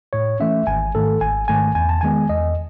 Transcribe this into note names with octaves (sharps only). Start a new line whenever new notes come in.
A2 C#5
E3 A3 C#4 E5
G#1 G#5
G#2 D#3 A3 A4
G#1 G#5
G#2 D#3 A3 G#5
E2 G#5
A5
D#3 G#3 B3 G#5
E2 D#5